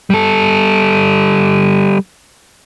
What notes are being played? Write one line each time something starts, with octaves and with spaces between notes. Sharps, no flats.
G3 A4